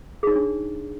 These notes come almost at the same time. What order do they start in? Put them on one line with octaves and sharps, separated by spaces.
G#4 D#4 C#5 D4